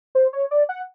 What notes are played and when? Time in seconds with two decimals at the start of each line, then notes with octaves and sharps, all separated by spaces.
0.15 C5
0.33 C#5
0.51 D5
0.69 F#5